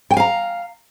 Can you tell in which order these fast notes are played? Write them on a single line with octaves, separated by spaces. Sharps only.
G5 G#5 F5 A#5